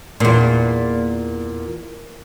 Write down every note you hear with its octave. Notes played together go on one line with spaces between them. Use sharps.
E2 A#2